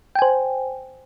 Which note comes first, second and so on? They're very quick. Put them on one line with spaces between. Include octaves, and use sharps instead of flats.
G5 G#5 C5